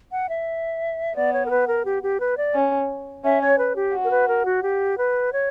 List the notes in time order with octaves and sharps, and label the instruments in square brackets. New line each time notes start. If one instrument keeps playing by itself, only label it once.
[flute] F#5
E5
[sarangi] B3 [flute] D5
[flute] C#5
A#4
B4
A#4
G4
G4
B4
D5
[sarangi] C#4
[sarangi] C#4 [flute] E5
[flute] C#5
B4
G4
[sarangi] F#4
[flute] A#4
B4
A#4
F#4
G4
B4
C#5